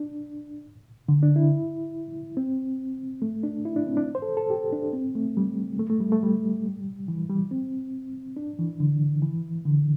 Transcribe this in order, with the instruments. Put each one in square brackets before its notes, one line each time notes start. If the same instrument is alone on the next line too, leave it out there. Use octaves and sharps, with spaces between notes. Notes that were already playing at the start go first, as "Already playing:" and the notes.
Already playing: [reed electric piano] D4
D3
D4
E4
C4
A3
D4
E4
D4
C4
D4
C5
A4
A4
G4
D4
C4
A3
G3
A3
A3
G3
A3
G3
E3
G3
C4
D4
E3
D3
E3
D3